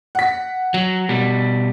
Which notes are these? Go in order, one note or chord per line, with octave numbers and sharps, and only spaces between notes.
F#5 B6
F#3
B2 G3